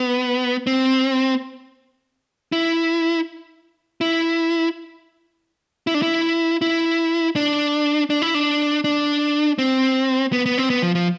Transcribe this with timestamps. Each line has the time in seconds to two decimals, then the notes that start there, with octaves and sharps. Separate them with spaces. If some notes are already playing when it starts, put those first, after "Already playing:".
Already playing: B3
0.67 C4
2.52 E4
4.01 E4
5.87 E4
5.94 D4
6.02 E4
6.62 E4
7.36 D4
8.10 D4
8.22 E4
8.34 D4
8.84 D4
9.58 C4
10.33 B3
10.46 B3
10.58 C4
10.70 B3
10.82 F3
10.95 F3